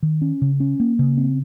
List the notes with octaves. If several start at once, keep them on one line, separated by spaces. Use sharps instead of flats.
D#3
C#4
C#3
C#4
A#3
C#3
C4